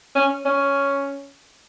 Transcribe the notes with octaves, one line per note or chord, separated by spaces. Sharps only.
C#4
C#4